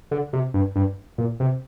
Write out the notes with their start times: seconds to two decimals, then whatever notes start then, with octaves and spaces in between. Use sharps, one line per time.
0.11 D3
0.33 C3
0.54 G2
0.76 G2
1.18 A#2
1.40 C3